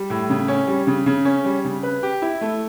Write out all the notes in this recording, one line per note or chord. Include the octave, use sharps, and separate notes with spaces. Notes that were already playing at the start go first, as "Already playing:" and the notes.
Already playing: G3
A2
C#3
C#4
G3
C#3
C#3
C#4
G3
C#3
B4
G4
E4
A3